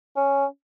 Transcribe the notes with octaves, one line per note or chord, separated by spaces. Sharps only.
C#4